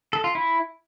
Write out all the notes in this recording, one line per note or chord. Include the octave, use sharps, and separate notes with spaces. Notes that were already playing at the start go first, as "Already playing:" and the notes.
A4
F4
E4